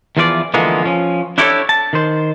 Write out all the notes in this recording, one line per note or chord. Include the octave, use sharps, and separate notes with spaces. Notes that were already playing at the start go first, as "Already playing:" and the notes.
E2 E3 F3 F4 B4 D5
D3 E3 F3 G#3 A#3 B3
F3 C#4
D4 E4 G4 A4 A#4 C#5
A5
D#3 C5